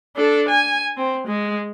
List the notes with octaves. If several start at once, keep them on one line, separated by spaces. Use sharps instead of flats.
D4 A4
G#5
C4
G#3